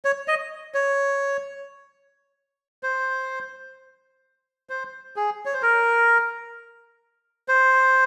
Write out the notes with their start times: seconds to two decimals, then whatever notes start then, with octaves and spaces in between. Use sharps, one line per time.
0.05 C#5
0.28 D#5
0.74 C#5
2.83 C5
4.70 C5
5.16 G#4
5.45 C#5
5.54 C5
5.62 A#4
7.48 C5